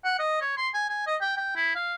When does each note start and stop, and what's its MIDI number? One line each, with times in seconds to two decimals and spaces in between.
0.04 0.18 78
0.19 0.39 75
0.41 0.55 73
0.57 0.68 84
0.74 0.87 80
0.89 1.02 80
1.07 1.16 75
1.21 1.34 79
1.37 1.52 79
1.56 1.71 64
1.75 1.95 77